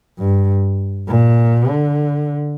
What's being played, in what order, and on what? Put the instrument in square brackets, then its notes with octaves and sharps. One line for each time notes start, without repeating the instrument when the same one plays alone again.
[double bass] G2
A#2
D3